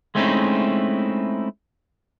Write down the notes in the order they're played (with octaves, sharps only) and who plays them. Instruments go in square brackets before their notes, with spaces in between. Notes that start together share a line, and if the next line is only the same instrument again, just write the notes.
[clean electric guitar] G#3 A3 C4 C#4 D#4 E4